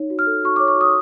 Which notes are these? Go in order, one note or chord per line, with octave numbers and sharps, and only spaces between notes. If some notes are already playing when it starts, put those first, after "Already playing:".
Already playing: D#4 C#5
F#4
F6
A4
F#4 C#6
D6
C#5
C#6
F#4 D#6